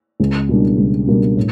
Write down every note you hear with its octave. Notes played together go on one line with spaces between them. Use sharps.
C#2
B2 G3 A#3 D4
C#2
B2 G3 A#3 D4
A2